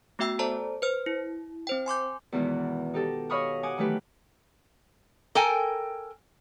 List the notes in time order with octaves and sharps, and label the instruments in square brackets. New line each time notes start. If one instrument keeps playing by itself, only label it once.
[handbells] A3 B3 F#4 E5 G5 E6
A4 C5 D5 A5 A#5
B4 C5 F6
E4
C4 C5 G5
G#5 C6 D6 G6
[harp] E2 G#2 B2 D#3 E3
D#4 G4 A4
C#5 D#5 F5 B5 C#6 D#6
F#5 G#5 D6 D#6
D#3 E3 F#3 A3 G4 B4
[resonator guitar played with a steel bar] A4 A#4 G5 G#5